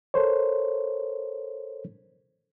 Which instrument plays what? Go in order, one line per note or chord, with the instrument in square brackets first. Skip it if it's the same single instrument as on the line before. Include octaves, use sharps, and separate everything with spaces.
[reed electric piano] A4 A#4 C5 C#5